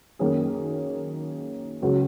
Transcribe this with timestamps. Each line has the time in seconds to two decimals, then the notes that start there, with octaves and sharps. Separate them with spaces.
0.19 F#2 D#3 A#3 C#4 G#4
1.82 C#2 C#3 F#3 C#4 F#4